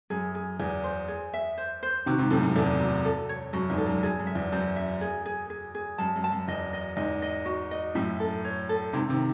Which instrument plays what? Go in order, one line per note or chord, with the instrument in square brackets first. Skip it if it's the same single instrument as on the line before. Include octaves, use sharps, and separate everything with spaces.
[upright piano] F#2 [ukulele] G#4
[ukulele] G#4
[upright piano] E2 [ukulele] G#4
[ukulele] C5
G#4
E5
C5
C5
[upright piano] C3 D#3 [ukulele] F#4
[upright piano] G#2 C3
[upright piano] F#2 A2 [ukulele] A4
[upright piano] F#2
[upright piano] E2 [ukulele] A4
[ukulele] F#4
A4
C#5
[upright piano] F#2 [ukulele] F#4
[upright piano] E2 G#2
[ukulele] A4
[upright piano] F#2
[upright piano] F#2 [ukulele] G#4
[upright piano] F#2
[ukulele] E5
[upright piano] E2
[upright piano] F#2 [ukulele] C5
[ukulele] E5
G#4
G#4
G#4
G#4
[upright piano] F#2 [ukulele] A5
[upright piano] F#2
[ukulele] A5
[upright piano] F#2
[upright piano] E2 [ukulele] D#5
[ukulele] D#5
[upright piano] E2 G#2 [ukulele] D#5
[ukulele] D#5
F#4
D#5
[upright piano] F#2 A2 [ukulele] E5
[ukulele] A4
C#5
A4
[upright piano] G#2 C3 [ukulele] E4
[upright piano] C3 D#3